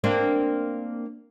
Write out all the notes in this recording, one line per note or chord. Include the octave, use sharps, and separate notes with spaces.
A#3 C4 D4